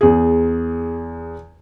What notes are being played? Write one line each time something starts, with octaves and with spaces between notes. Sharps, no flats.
E2 G#4